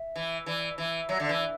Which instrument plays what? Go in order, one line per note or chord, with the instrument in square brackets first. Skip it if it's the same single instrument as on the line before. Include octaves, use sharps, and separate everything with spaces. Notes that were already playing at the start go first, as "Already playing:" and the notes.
Already playing: [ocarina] E5
[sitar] E3
[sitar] E3 [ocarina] D5
[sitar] E3 [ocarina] E5
[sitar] F#3
D3
E3